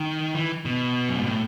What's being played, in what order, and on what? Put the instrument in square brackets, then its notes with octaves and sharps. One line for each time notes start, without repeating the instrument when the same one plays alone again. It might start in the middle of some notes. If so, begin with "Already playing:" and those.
Already playing: [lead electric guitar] D#3
E3
B2
F#2
G#2
A2